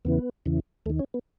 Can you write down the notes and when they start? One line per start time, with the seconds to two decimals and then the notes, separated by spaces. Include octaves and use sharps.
0.05 E2 C#3 E3 B3
0.46 E2 C#3 E3
0.86 D#2 A3
0.90 D#3
0.99 C#4
1.14 B3